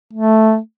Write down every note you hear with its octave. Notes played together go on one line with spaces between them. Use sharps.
A3